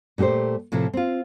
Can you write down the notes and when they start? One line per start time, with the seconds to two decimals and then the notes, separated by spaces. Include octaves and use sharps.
0.18 A#2 A3 F#4 G4 C5
0.72 A2 C3 F3 E4 A#4
0.93 C4 F4